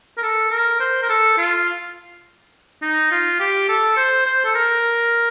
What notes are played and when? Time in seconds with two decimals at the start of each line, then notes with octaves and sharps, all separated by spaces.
0.18 A#4
0.23 A4
0.51 A#4
0.80 C5
1.02 A#4
1.09 A4
1.38 F4
2.82 D#4
3.11 F4
3.39 G4
3.69 A4
3.97 C5
4.26 C5
4.45 A4
4.55 A#4